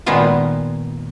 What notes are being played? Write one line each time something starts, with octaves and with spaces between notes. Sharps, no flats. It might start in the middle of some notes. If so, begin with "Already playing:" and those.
A#2 D#3 G#3 B3 F4 G#5